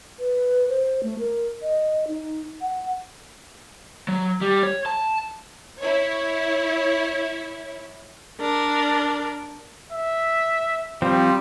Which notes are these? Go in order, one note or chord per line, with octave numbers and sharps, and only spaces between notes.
B4
C5
A3
A#4
D#5
D#4
F#5
F#3
G3
C#5
A5
E4 C#5
D4 A#4
E5
F3 G3 C4